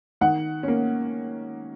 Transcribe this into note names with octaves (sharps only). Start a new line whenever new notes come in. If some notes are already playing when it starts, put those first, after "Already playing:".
D#3 F#5
A#3 C#4